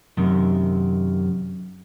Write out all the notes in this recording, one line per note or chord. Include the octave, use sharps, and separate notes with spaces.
F#2 C3 D#3